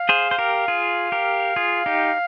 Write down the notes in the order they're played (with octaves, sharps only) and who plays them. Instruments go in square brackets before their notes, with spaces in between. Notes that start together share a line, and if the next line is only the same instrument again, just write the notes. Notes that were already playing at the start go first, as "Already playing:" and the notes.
Already playing: [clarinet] F5
[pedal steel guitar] G#4 C5
C5
G4 A#4
F4 G#4
G4 A#4
F4 G#4
D#4 G4